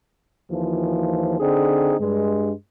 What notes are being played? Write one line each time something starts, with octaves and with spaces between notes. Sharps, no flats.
D#2 E3 F3
D3 C4 D#4 G#4
G2 G#3